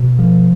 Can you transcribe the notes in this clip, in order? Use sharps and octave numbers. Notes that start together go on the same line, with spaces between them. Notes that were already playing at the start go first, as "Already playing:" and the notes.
Already playing: B2
F3